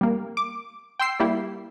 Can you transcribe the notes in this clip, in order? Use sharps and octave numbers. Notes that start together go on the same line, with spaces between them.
G3 A#3
D6
G5 C6 E6 C7
G3 A#3 E4 G4